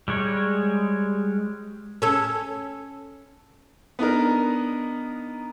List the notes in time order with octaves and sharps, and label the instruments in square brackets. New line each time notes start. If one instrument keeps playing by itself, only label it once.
[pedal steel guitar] G3 G#3 C#5
[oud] C#4 A4
[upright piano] B3 D4 D#4 A#4